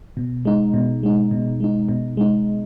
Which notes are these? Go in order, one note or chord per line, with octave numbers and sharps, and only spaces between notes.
B2
G#3 D#4
B2
G#3 D#4
B2
G#3 D#4
B2
G#3 D#4